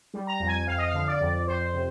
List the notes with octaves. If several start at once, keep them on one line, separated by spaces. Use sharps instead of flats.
G3
A#5
F2
G#5
F2 F5
D#5
F5
D3
D5
F2
F2 C5
C3